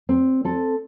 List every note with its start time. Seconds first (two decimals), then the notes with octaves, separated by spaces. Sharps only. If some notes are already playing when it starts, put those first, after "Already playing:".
0.09 C4
0.45 C4 A4